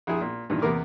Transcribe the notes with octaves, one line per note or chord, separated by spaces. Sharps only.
A#1 E4 G#4
A#2
G2 A#2 D#3 E3
E2 C3 A#3 B3 A#4 D6